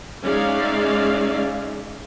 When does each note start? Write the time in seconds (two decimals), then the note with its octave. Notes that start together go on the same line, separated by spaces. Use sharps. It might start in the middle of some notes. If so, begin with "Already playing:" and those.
0.23 G#3 C#4 D#4 D5 E5 F5